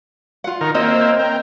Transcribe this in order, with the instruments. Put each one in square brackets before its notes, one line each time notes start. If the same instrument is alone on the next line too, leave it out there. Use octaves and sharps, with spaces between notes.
[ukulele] F4 F#5
[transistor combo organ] D#3 A#4
[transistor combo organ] A#3 C4 E5 [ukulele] C#5 D#5
[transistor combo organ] A#4 G5